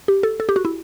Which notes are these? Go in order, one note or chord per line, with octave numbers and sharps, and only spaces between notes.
G4
A4
A4
G4
F#4
E4